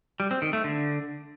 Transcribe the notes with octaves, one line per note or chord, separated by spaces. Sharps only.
G3
C4
D#3
A3
D3